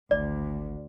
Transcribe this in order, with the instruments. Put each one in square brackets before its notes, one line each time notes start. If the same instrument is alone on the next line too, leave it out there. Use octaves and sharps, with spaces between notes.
[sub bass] G#1 [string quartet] D2 [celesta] D5